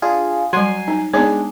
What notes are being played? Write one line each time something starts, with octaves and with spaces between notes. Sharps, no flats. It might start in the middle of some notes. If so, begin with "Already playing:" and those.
D4 F4 G#4
F#3 G3 G#5 C6 C7
D#4
G#3 B3 D4 D#4 G#4 C#5